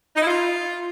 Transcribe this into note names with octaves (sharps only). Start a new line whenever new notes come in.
D#4
E4
F4